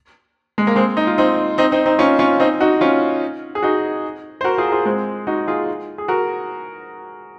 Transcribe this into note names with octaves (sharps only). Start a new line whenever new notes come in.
G#3
A#3
G#3 C4
D#4
F4
C4 D#4
C4 D#4
C4 D#4
C4 D#4
C#4 F4
C#4 F4
C4 D#4
D#4 F#4
C#4 F4
G#4
D#4 F#4
C5
F#4 A#4
F4 G#4
A#4
F4 G#4
G#3 C4
D#4 F#4
F4 G#4
G#4
F#4 A#4